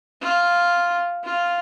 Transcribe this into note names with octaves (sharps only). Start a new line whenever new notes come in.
F4
F4